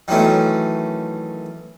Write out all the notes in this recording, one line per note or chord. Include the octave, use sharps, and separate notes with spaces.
D#3 E3 F#3 A3 C#4